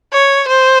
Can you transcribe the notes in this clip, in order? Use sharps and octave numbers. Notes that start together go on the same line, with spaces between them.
C#5
C5